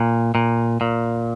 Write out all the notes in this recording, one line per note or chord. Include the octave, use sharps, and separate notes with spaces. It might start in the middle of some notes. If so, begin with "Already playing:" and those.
Already playing: A#2
A#2
A#2